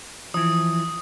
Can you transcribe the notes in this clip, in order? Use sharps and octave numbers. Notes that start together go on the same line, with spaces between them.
E3 F3 D#6